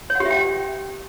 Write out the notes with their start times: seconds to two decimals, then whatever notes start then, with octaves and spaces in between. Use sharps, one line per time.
0.10 C#5
0.15 F#5
0.20 G4
0.25 E5
0.31 G5